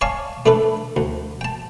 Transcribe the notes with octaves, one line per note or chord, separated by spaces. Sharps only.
C#5 D5 F5 G#5 A5 C#6
A3 D4 A4 B4
D2
G5 A5